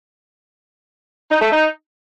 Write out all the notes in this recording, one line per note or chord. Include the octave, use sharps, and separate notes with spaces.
D#4
A3
D#4